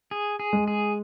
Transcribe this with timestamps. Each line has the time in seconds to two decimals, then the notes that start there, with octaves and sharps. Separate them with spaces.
0.11 G#4
0.40 G#4
0.53 G#3
0.68 G#4